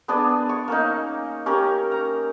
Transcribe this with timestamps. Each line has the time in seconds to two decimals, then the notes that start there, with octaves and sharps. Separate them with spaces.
0.08 B3 D4 G#4 D5
0.49 C#6
0.68 A#3 C#4 D#4
1.46 C#4 G4 A#4
1.91 A#5